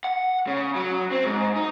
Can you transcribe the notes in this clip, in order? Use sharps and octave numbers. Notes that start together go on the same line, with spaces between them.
F#5
C#3
F#3
C4
G#2
D#4